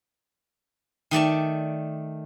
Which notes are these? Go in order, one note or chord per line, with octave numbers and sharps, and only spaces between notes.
D#3 A3 D5 A5